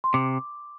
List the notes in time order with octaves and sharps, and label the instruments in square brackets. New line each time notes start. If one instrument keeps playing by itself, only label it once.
[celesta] C6
[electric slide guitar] C3 [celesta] D6